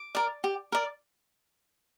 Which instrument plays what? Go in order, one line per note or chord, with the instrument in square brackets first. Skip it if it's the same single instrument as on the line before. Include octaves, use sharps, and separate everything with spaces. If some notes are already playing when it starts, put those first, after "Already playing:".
Already playing: [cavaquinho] D6
A#4 D5
G4
A#4 D5